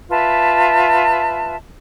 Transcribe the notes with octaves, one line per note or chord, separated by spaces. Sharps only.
F4 B4 E5 A5